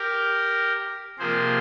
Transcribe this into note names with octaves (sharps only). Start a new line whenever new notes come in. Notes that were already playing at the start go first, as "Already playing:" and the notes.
Already playing: G4 A#4
C3 F3 A#3 G#4 C5